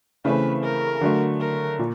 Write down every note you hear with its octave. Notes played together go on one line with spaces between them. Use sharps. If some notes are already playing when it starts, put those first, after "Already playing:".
C#3 E3 A3 C4 B4
A#4
D3 F#3 A3
A#4
A#2